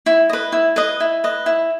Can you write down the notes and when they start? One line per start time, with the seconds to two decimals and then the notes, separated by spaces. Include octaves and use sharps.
0.06 E4
0.29 B4 D#5
0.52 E4
0.76 B4 D#5
1.00 E4
1.24 B4 D#5
1.46 E4